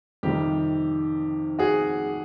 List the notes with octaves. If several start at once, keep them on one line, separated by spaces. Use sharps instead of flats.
F2 C3 D#3 G3 G4
F#4 G#4